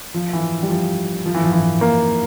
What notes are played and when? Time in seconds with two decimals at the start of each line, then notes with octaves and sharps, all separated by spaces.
0.14 F3
0.33 E3
0.63 G3
0.70 F3
1.26 F3
1.34 E3
1.44 F3
1.53 E3
1.81 A#3